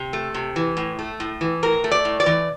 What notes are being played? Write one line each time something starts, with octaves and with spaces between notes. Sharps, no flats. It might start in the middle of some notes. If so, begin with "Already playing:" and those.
Already playing: C3
A3
C3
E3
A2
A3
A2
E3
A2 A#4
A3
D5
A2
D5
E3